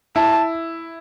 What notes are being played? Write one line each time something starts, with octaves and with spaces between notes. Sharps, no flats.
E4 A5